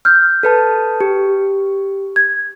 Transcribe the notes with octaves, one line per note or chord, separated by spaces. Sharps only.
F6 G6
A4 B4 A5
G4
G#6